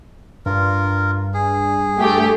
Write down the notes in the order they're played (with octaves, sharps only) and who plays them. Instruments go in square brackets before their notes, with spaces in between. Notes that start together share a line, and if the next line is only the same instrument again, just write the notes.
[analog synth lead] G2 [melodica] F4 A#4
[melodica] G#4
[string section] A3 G4